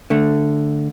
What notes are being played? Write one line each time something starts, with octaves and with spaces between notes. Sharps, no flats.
D3 A3